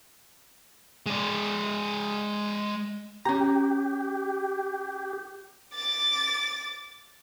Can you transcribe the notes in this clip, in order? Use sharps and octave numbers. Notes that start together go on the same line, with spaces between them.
G#3 D5
C#4 G4 A#5
D6 A6